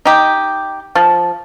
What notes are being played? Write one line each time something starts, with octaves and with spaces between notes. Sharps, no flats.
D#4 G4
F3